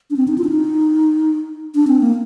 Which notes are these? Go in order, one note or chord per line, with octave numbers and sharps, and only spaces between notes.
D4
C4
D#4
F4
D4
D#4
D4
C4
A#3